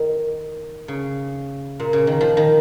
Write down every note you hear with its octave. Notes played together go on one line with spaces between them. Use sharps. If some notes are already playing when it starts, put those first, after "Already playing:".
Already playing: D#3
C#3
A#2
C#3
D#3
F3
D#3